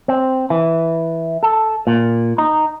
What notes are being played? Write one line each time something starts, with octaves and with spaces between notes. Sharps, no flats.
C4
E3
A4
A#2
D#4